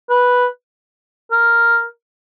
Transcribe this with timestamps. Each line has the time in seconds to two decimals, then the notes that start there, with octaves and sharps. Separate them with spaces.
0.10 B4
1.31 A#4